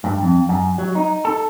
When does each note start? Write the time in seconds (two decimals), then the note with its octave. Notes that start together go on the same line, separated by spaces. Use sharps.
0.04 G2
0.22 F2
0.49 F#2
0.78 F#3
0.95 D#4
1.25 A4